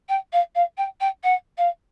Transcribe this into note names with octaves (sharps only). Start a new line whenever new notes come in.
G5
F5
F5
G5
G5
F#5
F5